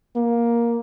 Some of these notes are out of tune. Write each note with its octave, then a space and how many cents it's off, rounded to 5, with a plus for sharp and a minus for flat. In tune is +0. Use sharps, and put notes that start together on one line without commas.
A#3 +10